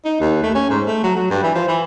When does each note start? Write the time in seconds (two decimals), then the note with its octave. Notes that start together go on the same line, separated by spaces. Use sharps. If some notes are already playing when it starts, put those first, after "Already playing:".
0.05 D#4
0.20 D#2
0.43 A3
0.55 C#4
0.70 G#2
0.87 A3
1.03 F#3
1.16 F#3
1.30 G2
1.43 E3
1.55 F3
1.68 E3